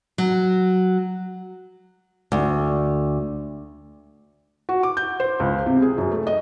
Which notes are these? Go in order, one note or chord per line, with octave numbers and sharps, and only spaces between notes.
F#3
D2
F#4
D6
G6
C5
C#2
C3
G#4
F#2
A3
D#5